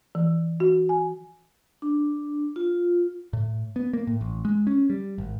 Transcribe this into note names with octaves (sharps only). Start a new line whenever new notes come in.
E3
F#4
G#5
D4
F4
A2
B3
A#3
A2
A1
G#3
C#4
G3
G#1